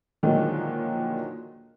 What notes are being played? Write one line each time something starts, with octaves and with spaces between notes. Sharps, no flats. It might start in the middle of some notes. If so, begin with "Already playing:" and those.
A#2 D3 D#3 F3 F#3 G#3